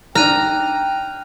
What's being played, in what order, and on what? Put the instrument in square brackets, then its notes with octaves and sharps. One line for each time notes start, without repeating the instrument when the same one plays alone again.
[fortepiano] D4 D#4 [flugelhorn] G5 [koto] A#5 [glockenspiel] F6 F#6 D#7